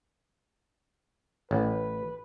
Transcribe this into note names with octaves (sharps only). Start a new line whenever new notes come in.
A1 B4